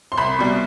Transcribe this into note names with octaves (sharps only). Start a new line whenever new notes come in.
C6
C2 B5
B2 G3